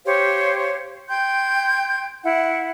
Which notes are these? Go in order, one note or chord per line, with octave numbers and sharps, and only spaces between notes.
G4 C5 C#5 F5
G5 C6 G6 G#6
E4 F#5